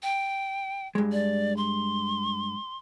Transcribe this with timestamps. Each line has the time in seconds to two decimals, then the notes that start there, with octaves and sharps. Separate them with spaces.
0.03 G5
0.95 G2 G#3
1.12 D5
1.57 C6